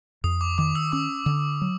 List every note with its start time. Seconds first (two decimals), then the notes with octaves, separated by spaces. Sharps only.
0.24 F2 D#6
0.41 D6
0.58 D#3 D6
0.75 E6
0.92 C#4 D6
1.26 D3
1.62 F#3